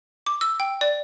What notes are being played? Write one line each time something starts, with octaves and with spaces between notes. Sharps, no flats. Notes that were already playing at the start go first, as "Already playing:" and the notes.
D6
E6
G5
D5